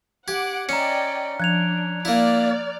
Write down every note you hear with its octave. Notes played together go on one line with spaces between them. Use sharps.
G4 F#5 D6 G#6
C#4 D5 D#5 G5 A#5 C#7
F3 D4 F#6 G#6 F7
A#3 E4 D5 F6